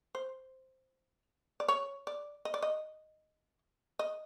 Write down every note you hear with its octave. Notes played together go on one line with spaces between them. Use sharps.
C5
D5
C#5
D5
D#5
D5
D#5
D#5